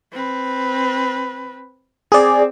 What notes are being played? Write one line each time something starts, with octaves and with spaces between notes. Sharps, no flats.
C4 B4
C4 G#4 D5